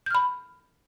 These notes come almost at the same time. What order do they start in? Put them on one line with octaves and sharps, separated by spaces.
G6 F6 B5